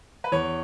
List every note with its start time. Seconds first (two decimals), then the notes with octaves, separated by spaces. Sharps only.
0.24 B4
0.32 E2 C#5